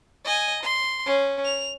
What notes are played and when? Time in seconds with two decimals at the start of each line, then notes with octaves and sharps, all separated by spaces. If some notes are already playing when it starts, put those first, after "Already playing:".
0.25 D#5 G#5
0.63 C6
1.06 C#4
1.45 F7